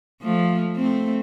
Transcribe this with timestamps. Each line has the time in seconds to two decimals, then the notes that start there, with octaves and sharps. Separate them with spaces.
0.21 F3 A3
0.76 A3 C4